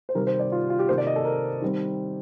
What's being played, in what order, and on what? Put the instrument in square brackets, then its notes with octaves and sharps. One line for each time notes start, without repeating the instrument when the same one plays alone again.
[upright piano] C5
C3 D#3 G3 A#4
C5
D5
F4
F4
G4
C3 D#3 A#3 C5
D5
D#5
A4
A#4
D#3 G3 C4